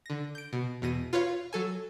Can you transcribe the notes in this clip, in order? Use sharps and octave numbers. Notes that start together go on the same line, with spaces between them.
D3 A#6
G6 D7
B2
E2 B2 A#6 D#7
F4 B4 C#5 F5
F#3 A4 G#5